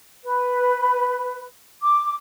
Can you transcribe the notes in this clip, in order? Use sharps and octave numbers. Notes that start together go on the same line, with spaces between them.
B4
D6